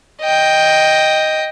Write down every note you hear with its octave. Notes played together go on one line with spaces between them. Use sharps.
D#5 G5